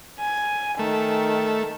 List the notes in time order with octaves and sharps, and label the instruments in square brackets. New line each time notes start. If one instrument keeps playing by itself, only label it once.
[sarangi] G#5
[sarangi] D#3 [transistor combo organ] A3